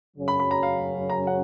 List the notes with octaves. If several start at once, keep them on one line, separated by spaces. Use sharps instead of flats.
F#2 C#3 F#3 C#4
B5
B5
A#5
F5
A#5
F#5